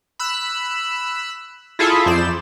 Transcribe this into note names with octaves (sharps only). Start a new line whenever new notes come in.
B5 E6 F#6
E4 F4 G#4 A4 E5
F2 C5 D5 E7